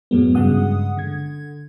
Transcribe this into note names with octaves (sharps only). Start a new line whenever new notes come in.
F#2 A2 F#3 G#3 B3
G2 C#3 G#3 F#5 D#6
D3 G#6